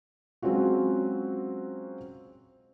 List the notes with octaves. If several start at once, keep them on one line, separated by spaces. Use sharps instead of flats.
F#3 G#3 C4 C#4 F4 F#4